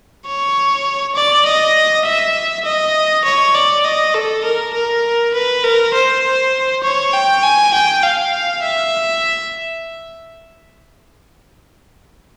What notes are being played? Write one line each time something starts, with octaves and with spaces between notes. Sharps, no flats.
C#5
D5
D#5
E5
D#5
C#5
D5
D#5
A4
A#4
A#4
B4
A#4
C5
C#5
G5
G#5
G5
F5
E5